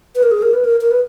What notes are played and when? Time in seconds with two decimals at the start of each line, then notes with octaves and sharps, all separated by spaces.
0.15 B4
0.23 A#4
0.31 G#4
0.42 A#4
0.53 B4
0.65 A#4
0.81 A#4
0.91 B4